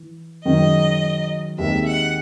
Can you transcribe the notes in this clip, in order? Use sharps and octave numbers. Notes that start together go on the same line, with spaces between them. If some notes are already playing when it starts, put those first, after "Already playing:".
Already playing: E3
F#2 D#3 G#3 C#4 D#5
D#2 D#3 G#3 C4 D#4 E5
F#5